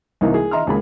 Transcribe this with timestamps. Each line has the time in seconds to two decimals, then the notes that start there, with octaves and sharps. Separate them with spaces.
0.21 C2 E3 A#3 D#4
0.34 G#4
0.51 D#5 E5 A#5 C6 F6
0.66 G#1 C#2 A#3 G#4 B5